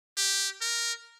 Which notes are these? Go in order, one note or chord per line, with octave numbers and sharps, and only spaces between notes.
G4
A#4